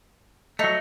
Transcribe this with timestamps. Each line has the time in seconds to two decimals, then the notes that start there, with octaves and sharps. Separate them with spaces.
0.59 F#3 A3 D#4